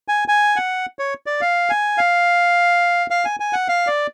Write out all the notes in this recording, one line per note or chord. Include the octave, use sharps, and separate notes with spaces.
G#5
G#5
F#5
C#5
D5
F5
G#5
F5
F5
G#5
G#5
F#5
F5
D5